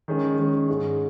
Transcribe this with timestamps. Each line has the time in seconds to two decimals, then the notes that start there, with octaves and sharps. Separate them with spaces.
0.08 D#3 G#3 C#4
0.38 D#3 G#3 C#4
0.68 G#2 G#3 C#4